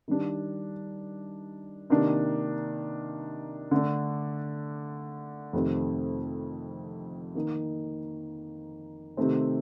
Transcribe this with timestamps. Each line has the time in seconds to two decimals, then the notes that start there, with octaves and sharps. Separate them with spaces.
0.08 D#3 G3 D4
1.90 C3 D#3 A#3 D4
3.71 D3 A3 D4
5.53 F2 C3 D#3 A3 C4
7.35 D#3 A#3 D#4
9.17 C3 D#3 A3 C4